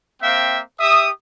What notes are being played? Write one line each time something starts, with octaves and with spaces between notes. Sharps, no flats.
A#3 C4 E5 F5 G5
G4 E5 D#6